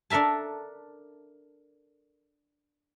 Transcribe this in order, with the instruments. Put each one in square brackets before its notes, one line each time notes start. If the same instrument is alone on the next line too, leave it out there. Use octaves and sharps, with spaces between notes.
[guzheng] D4 A4 A#4 E5 A5